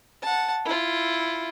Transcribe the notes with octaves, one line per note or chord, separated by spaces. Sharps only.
F#5 A5
E4 F4